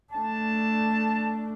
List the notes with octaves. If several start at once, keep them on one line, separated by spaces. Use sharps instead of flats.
A3 D4 A5